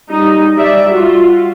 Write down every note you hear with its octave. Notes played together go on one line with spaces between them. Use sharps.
G3 D#4
G3 D5 E5
F4 F#4